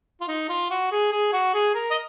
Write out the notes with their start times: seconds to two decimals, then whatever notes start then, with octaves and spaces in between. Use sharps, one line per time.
0.21 F4
0.28 D#4
0.49 F4
0.70 F#4
0.92 G#4
1.12 G#4
1.33 F#4
1.54 G#4
1.74 A#4
1.91 D#5